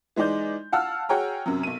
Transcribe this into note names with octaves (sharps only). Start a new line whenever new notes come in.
E3 G#3 D#4 D5 G6
F5 F#5 A5 E6 F6
F#4 G#4 C#5 G5 A#5
F#2 C3 F#3
B1 D#7